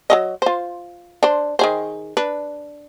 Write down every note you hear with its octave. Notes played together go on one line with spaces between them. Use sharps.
F#3 C#4 D#5
F4 C5
D4 C5
D#3 G#4 C5
D4 B4